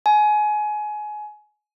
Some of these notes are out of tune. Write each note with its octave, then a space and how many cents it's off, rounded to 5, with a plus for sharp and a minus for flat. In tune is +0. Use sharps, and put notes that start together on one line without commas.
G#5 +25